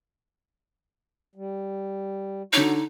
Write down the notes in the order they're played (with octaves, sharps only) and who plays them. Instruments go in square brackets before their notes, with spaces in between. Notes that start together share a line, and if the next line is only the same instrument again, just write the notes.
[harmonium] G3
[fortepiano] D3 C#5 [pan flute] D#4 [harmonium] F#4